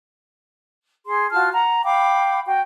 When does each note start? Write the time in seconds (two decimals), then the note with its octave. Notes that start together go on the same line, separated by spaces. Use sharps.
1.06 G#4 C6
1.31 F4 F#4 A5 F6
1.53 F#5 A#5
1.84 F5 G5 B5 D6
2.46 F#4 G5